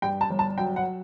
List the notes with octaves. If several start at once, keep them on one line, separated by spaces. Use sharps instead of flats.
G2 G5
A5
G1
A5
F#3 G5
F#5